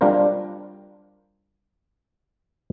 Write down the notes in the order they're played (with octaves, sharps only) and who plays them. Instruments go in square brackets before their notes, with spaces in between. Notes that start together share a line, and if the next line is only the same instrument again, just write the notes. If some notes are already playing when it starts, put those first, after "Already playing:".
[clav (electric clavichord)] G3 D4 F4 A#4 C5